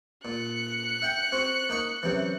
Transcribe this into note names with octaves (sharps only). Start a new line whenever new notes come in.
A#2 F#6 C#7
E5 F#5 G5
C4 F#4
A#3 D#4 C#6
F#2 C3 E3